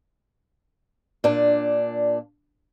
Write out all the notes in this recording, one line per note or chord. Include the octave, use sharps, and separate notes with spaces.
A#2 D4